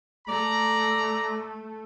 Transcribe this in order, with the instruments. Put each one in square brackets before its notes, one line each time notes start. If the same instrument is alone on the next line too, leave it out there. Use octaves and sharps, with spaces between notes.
[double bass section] A3 [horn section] D5 A#5